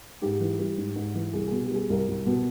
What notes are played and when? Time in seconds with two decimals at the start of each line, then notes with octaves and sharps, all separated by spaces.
0.22 G#2 G4
0.40 E3
0.59 G3
0.78 G#2
0.96 G#2
1.15 E3
1.33 C2 G#4
1.48 B2 G#4
1.65 G4
1.71 G3 G#4
1.90 C2 A#4
2.08 C2
2.26 B2